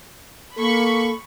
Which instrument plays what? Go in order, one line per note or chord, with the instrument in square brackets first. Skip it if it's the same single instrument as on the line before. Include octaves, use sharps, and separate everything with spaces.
[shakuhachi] A#3 [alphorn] A4 [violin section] B5 C#6